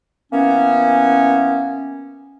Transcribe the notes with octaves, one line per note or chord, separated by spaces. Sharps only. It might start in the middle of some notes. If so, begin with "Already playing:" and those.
E3 A#3 B3 C#4